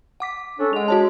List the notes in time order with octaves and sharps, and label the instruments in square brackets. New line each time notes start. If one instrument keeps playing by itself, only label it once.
[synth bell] F#5 D6 B6
[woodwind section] C#4 D4 A4
[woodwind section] G#3 [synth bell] F#5 F7
[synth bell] F#4 C#5 A5